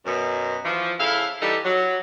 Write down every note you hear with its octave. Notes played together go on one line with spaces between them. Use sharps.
F#2 B2
E3 F3
C#3 E4 A4 F5
E3 G3 D#4 G4 A4
F#3